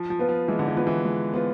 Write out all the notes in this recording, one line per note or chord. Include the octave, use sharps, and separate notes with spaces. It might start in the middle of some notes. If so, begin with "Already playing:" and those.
Already playing: F3
F3
B3 F4 B4
F3
E3 G#3
D3
E3
B3 F4 B4
E3
G#3
B3 F4 B4